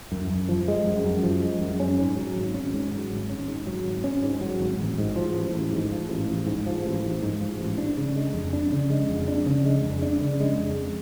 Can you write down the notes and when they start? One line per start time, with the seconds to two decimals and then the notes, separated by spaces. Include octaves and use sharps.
0.12 F#2
0.30 F#2
0.49 F3
0.68 G#3
0.87 F#2
1.05 F#2
1.23 F3
1.43 G#3
1.61 F#2
1.80 C#4
1.98 G#2
2.17 F#3
2.36 G#1
2.54 C#4
2.73 G#2
2.92 F#3
3.11 G#1
3.29 C#4
3.48 G#2
3.67 F#3
3.86 G#1
4.04 C#4
4.23 G#2
4.41 F#3
4.60 G#1
4.79 A1
4.98 G#2
5.16 F3
5.35 A1
5.53 A1
5.73 G#2
5.91 F3
6.10 A1
6.28 A1
6.47 G#2
6.66 F3
6.85 A1
7.03 A1
7.23 G#2
7.41 F3
7.59 A1
7.78 D4
7.97 C#3
8.16 G#3
8.34 F2
8.53 D4
8.72 C#3
8.90 G#3
9.09 F2
9.28 D4
9.46 C#3
9.65 G#3
9.83 F2
10.02 D4
10.22 C#3
10.40 G#3
10.58 F2